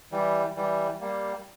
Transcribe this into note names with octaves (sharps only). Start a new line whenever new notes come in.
E3 G3
E3 G3
G3 A#3